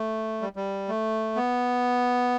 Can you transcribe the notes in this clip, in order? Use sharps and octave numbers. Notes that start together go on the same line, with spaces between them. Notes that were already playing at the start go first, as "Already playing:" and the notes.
Already playing: A3
G3
G3
A3
B3